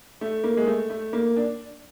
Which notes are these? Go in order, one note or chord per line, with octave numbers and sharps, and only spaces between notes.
A3
A#3
G#3
A3
A3
A#3
D4